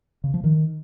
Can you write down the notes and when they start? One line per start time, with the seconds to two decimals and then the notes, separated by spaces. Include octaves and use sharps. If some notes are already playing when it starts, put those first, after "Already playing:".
0.24 C#3
0.34 F3
0.44 D#3